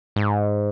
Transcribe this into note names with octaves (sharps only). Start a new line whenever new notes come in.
G#2